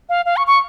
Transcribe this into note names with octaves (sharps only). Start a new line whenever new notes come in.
F5
F5
C#6
C#6